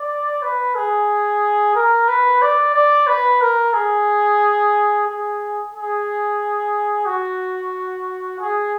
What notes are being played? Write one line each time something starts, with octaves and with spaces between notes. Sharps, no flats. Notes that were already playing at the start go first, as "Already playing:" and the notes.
Already playing: D5
B4
G#4
A#4
B4
D5
D5
B4
A#4
G#4
G#4
G#4
F#4
G#4